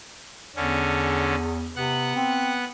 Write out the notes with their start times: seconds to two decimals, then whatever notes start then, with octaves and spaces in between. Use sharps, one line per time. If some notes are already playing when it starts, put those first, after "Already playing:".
0.56 E2 D3 C#4
1.76 C3 B3 F#5 F#6
2.16 C4